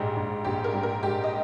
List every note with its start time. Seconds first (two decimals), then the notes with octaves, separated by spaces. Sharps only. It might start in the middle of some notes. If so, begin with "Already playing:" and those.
Already playing: A#1 G#2 G3 G4
0.16 A#1
0.45 A#1 G4
0.64 A#4
0.74 G3
0.83 A#4
1.02 G#2 G4
1.24 D#5